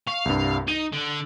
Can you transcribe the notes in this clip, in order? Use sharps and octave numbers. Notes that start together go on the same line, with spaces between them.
F5 C#6
C2 G2
D#4 D#7
D3